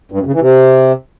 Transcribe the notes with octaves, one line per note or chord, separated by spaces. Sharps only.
G2
F#2
C#3
E3
C3